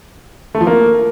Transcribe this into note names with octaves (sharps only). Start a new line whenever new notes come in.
A3
F3
A#3